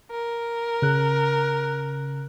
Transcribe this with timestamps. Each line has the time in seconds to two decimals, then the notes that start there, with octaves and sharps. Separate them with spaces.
0.11 A#4
0.82 C#3 F#6